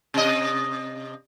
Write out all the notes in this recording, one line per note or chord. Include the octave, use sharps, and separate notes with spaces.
C3 D#5